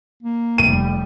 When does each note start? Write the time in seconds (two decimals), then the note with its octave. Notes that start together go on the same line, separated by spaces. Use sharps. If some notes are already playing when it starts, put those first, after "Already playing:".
0.23 A#3
0.58 F1 G3 D#7